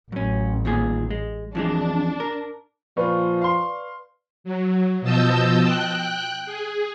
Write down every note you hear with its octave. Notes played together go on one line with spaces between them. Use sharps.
A1 F#2 C#4
D#2 A#2 G#4
G#3
F2 E3 G#3 D4
A#4
A#2 F3 F4 B4 D5 C#6
F5 C6
F#3
B2 F3 D#5 A5 E6 G6
G5 F#6
G#4